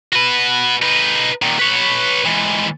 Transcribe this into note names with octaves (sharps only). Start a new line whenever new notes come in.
F#4 B4
D#4 B4
A#2 D#3
B4 C#5
G#2 E3